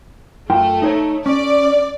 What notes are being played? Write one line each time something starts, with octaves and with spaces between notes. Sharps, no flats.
F#2 A3 F4 G5
D#4 C5 C#5
C#4 D5